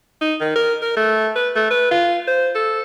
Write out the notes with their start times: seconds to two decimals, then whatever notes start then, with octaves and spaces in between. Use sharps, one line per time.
0.21 D#4
0.41 D#3
0.56 A#4
0.82 A#4
0.97 A3
1.36 B4
1.56 A3
1.71 B4
1.91 F4
2.28 C5
2.55 A4